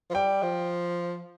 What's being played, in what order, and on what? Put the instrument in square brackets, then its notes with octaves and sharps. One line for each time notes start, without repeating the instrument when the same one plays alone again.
[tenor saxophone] F3
[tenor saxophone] G3 [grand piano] G5
[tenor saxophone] F3